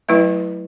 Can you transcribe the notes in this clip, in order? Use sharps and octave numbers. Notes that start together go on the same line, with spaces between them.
F#3 A3 E4 B4 E5